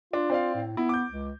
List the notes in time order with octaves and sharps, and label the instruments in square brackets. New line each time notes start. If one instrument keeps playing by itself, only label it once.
[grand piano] D4 [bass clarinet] F4
[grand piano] C4 D5 F5
[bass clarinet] A2
[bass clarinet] B3 [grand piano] E4
[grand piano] D6 G6
[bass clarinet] C#2